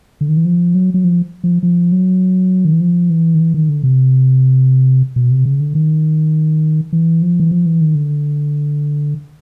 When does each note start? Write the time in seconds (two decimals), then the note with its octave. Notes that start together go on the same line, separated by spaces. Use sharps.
0.21 D3
0.29 D#3
0.37 E3
0.45 F3
0.75 F#3
0.94 F#3
1.04 F3
1.44 F3
1.63 F3
1.92 F#3
2.65 D#3
2.73 E3
2.80 F3
3.10 E3
3.35 D#3
3.40 E3
3.54 D#3
3.69 D3
3.83 C3
5.16 B2
5.31 C3
5.45 C#3
5.60 D3
5.75 D#3
6.93 E3
7.22 F3
7.40 E3
7.51 F3
7.66 E3
7.81 D#3
7.95 D3